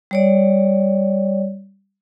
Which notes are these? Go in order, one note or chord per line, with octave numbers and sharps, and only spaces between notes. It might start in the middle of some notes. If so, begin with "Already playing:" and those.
G3 C#5 D5